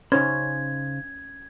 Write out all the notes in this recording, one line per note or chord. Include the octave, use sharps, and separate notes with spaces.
C#3 C#4 D#4 C5 G#6